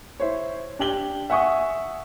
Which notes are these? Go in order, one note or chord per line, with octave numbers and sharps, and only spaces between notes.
E4 C5 C#5
D4 G4 F#7 G7
E5 F#5 G#5 C#6 D#6